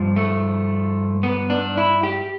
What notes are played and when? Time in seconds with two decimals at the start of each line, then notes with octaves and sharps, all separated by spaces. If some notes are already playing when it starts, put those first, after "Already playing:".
Already playing: G2 F3
0.16 A3
1.23 B3
1.50 D4
1.78 E4
2.03 G4